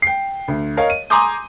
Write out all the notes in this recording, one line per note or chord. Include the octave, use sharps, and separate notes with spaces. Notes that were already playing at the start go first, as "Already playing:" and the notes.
G5 C7
D2
A#4 C#5 D#5 F5
D#7
G#5 A#5 C6 D6 D#6 G6